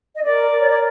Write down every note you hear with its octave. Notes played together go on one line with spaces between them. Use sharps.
D#5
A#4 D5
A#4
C#5
D5